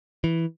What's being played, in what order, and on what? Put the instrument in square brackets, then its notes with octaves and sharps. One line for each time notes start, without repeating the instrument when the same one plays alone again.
[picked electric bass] E3